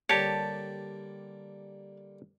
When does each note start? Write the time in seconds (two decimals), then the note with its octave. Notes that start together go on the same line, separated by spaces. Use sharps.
0.09 D3 G3 A#3 G4 C#5 A5